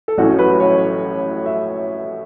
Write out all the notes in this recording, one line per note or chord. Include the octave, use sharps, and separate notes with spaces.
A4
A1 A2 F#3 C#4 F#4
B4
C#5
E5